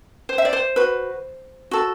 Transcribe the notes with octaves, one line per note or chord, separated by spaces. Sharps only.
C5
E5
D5
C5
F#4 B4
F#4 A4